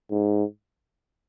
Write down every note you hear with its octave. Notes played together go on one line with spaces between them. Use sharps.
G#2